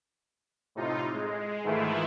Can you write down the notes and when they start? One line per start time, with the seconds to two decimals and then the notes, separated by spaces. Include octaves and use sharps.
0.75 A2 C3 D#4 F4
1.14 G#3
1.63 G#2 D#3 E3 A3 E4 F4